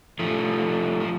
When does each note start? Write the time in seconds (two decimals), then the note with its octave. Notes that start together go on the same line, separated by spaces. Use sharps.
0.19 A2 F3 A3
0.65 A2
1.00 F3